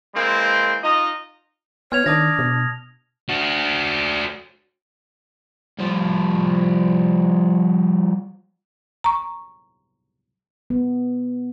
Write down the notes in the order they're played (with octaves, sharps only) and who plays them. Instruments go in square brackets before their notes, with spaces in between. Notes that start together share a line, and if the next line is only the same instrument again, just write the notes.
[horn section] E3 G#3 A#3 C4
D#4 F4 D#5
[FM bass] B3 [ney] C#5 [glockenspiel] F6 G#6 F7
[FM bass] D#3 [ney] D4 [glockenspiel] A5 D#6 A#6
[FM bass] B2
[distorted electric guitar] D4 F#4
[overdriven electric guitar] F3 G3
[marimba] A#5 C#6
[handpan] B3